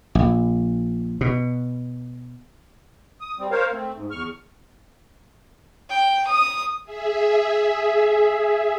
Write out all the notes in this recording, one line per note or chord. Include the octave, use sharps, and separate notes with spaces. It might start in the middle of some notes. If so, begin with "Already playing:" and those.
A#1
B2
D#6
G3 C4
A#4 C5 C#5 F5
A3 C4
G#2
E2 C#6 F6
G5
D#6
G#4 E5